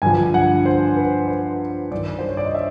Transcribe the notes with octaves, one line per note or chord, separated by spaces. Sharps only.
G2 D3 F3 G#5
F#5
C5
B4
C5
G2 D#3 D5
C5
C#5
D5
D#5
E5